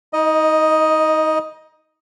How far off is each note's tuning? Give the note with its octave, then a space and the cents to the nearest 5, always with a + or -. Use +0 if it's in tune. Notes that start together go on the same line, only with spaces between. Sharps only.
D#4 +30 D#5 +0